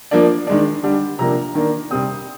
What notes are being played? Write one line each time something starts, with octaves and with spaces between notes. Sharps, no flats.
F3 A#3 D4
D#3 G#3 D4
D3 G3 D4
C3 F3 A#3 D4 A#5
D#3 A#3 D4
C3 G3 C4 D#6